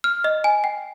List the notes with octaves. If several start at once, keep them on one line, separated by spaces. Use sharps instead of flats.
F6
D#5
G#5
G5